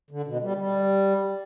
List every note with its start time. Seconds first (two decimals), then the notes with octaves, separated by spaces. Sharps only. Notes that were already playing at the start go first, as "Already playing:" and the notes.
0.11 D3
0.26 B2
0.42 G3
0.57 G3